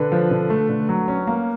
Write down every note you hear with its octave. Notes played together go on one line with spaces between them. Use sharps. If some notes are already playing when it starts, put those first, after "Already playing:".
Already playing: D3 B4
F3
D3
A3
D3
F#3
C#4
A#3